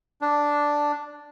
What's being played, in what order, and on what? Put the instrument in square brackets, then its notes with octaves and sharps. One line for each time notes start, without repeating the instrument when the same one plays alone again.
[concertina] D4